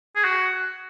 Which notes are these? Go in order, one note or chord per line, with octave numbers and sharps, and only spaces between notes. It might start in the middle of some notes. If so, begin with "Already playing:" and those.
G#4
F#4